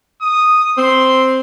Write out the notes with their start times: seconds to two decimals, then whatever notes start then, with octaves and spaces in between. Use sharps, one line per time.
0.21 D#6
0.78 C4 C6